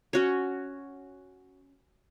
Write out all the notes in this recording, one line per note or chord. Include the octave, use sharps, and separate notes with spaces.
C#4 F#4 C#5